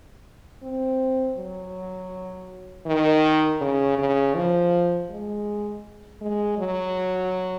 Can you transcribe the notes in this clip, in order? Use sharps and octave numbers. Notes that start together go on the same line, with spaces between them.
C4
F#3
D#3
C#3
C#3
F3
G#3
G#3
F#3